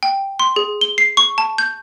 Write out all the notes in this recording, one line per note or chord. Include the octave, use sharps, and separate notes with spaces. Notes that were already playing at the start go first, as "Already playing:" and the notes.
G5
C6
G#4
G7
C7
C#6
A5
G6